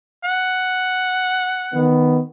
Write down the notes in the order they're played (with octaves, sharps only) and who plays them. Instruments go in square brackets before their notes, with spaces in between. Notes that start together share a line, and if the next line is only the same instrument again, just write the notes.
[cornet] F#5
[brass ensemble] D#3 B3